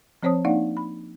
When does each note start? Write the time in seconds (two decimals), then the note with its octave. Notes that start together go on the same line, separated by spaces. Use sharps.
0.23 F3 C4 C5 C#5 A5 D#6
0.45 A#3 D4 D#4 D5 F5 F#5
0.77 B5